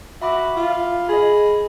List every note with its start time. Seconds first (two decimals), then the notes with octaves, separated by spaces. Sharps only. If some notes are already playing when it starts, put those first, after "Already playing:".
0.22 F#4 E5 B5 D6
0.56 F4
1.09 G#4 D#5 B5